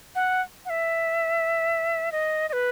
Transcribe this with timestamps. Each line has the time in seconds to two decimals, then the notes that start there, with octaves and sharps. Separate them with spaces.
0.15 F#5
0.65 F#5
0.70 E5
2.12 D#5
2.49 D#5
2.53 B4